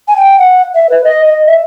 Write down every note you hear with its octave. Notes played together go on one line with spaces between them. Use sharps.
G#5
G5
F#5
E5
B4
D#5
D#5
E5